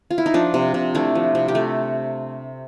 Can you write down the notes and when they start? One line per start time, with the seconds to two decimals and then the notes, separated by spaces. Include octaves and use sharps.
0.11 F4
0.18 E4
0.26 D#4
0.34 F3 D4
0.54 C3
0.74 C3
0.95 A3 D4 E4
1.15 F3
1.35 C3
1.48 G4
1.55 A3